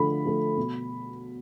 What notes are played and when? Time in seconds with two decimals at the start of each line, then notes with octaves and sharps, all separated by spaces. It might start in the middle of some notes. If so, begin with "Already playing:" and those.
Already playing: D3 F3 A3 B5
0.25 F3 A3
0.57 B2